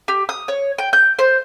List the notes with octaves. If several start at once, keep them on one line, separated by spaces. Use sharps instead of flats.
G4
D#6
C#5
G5
G6
C5